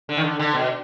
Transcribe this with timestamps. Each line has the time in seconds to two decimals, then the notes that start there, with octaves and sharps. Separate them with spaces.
0.09 D3
0.17 D#3
0.24 D3
0.39 D3
0.54 B2